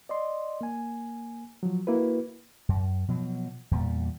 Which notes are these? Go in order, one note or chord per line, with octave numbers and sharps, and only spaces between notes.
D5 D#5 C6
A#3 G#5
F3 F#3
A#3 E4 F#4 B4
F#2
B2 F3 F#3
E2 A#2 G3